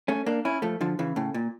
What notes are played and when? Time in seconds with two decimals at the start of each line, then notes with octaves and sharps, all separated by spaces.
0.08 A3 C#4
0.26 A#3 D4
0.45 C#4 E4
0.62 F3 A3
0.81 D3 F3
0.99 C#3 E3
1.16 A2 C#3
1.34 A#2